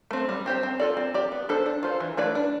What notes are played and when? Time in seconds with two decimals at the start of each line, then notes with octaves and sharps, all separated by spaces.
0.11 A3 C4
0.29 G3
0.46 C4 G4 C5
0.63 C4
0.80 F4 A4 D5
0.97 C4
1.14 G4 D5
1.32 B3
1.49 D4 A4 C5
1.66 D4
1.83 F4 A4 C5
2.00 E3
2.17 A3 E4 B4 D5
2.35 D4